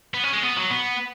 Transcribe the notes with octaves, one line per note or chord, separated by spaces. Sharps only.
B3
C#4
G#3
B3
F#3
B3